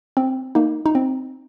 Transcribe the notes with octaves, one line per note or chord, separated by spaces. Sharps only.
C4
A#3 D#4
D#4
C4